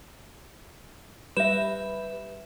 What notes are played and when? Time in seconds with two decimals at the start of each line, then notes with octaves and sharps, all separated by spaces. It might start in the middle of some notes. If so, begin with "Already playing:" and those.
1.37 G3 B4 E5 E7